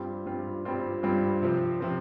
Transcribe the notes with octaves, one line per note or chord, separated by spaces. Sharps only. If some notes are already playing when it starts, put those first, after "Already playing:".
Already playing: G2 G3 C4 F4
G2 G3 C4 F4
G2 G3 C4 F4
G2 G3 C4 F4
C3 F3 C4
C3 F3 C4